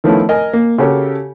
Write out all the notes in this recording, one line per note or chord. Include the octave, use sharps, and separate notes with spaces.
D#3 F3 A3 B3 C#4 E4
A#4 D#5 G#5
A#3
C#3 F#4 G4 A4 A#4 C#5